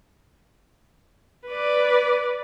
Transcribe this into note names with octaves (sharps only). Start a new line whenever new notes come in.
B4 D5